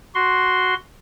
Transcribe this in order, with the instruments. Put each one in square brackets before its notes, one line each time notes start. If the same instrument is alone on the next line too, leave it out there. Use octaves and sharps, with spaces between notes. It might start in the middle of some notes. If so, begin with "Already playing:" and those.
[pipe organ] F#4 C6